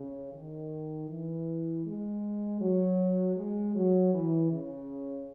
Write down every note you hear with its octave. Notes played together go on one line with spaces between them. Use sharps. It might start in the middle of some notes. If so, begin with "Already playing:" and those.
Already playing: C#3
D#3
E3
G#3
F#3
G#3
F#3
E3
C#3